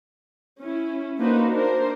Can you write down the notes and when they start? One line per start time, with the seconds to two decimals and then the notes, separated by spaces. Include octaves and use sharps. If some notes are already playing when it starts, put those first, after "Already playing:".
0.62 C#4 E4
1.18 A#3 D4 D#4 F#4 B4 C5
1.50 D4 A#4 C5